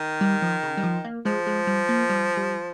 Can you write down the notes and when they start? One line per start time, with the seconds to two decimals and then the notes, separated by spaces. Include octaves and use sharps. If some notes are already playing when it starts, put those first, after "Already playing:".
Already playing: D#3
0.21 G3
0.42 F3
0.63 C#3
0.77 G3
0.83 F3
1.05 A#3
1.25 F3 G#3
1.47 G#3
1.67 G3
1.89 A#3
2.10 G3
2.37 G3